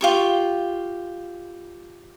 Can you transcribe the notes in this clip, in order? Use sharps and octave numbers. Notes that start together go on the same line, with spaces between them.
F4 G4 C#6